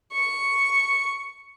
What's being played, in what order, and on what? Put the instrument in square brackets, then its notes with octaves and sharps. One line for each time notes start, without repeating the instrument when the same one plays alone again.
[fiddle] C#6